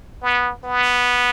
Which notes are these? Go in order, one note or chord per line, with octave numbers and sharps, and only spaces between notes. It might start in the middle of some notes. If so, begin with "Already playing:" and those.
B3
B3